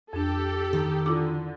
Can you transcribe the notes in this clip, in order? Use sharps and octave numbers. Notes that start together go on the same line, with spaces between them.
F2 D4 G4 A4
D#3
D3 E4 F4 D6